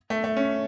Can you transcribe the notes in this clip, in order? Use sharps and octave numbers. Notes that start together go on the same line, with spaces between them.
A3
A3
C#4